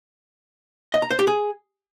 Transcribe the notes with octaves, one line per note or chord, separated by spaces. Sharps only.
D#5
A#5
C5
G4
G#4